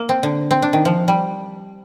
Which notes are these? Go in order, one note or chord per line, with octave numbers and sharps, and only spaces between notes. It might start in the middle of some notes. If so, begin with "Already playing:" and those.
Already playing: A#3
C4
D3
C4
D4
D#3
F3
G3